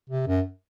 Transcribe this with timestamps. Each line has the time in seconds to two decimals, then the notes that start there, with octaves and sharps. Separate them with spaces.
0.10 C3
0.27 F#2